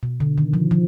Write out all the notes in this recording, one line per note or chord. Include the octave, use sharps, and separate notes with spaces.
B2
D3
D#3
F3
F3